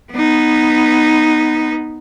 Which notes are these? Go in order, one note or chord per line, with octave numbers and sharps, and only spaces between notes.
B3 D#4